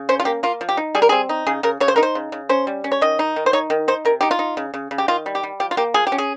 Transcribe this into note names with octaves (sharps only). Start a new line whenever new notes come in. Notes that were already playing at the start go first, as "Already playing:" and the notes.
Already playing: C#3
C#4 C5
F4
A#3 G4
A#3 F4
F3
G4
D#4
G3 G#4
A#4
C4 G#4
D#4
C#3 G#4
C#3 A#4
C#3 C#5
C5
D#4 A#4
C5
C#3
C#3
C#4 C5
G3
C#4
C#5
D#3 D#5
D#4
D#3
C5
D#4 C#5
D#3
D#4 C5
C3 A#4
D#4 G4
F4
D#4
C#3
C#3
C#3
G4
D#3 F4
G3
G4
G3
F3 G4
F4
A#3 G4
F3 G#4
G4
C#4
G#4